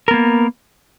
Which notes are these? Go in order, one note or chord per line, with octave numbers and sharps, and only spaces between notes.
A#3 B3 A#4